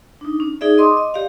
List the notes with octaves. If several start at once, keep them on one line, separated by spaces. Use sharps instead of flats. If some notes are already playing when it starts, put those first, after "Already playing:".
D4 D#4
C#4
D#4 G#4 D5 E5
D#5 C6 D6 D#6
D#5
G4 D5 F5